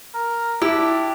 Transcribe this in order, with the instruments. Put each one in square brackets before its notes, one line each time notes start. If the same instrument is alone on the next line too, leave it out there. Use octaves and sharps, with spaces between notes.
[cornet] A#4
[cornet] D4 [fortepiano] E4 [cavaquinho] G4